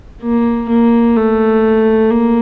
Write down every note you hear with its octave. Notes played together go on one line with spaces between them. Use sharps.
A#3
A#3
A3
A#3